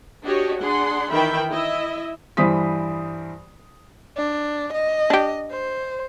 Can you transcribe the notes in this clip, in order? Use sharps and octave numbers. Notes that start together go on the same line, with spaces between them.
D4 F#4 G4 C#5 D#5
D4 G#4 F#5 C6
D#3 E3 D#4 E5 G5 B5
E4 D#5 E5
G2 E3 C5 D#6 B6
D4
D#5
D4 G4
C5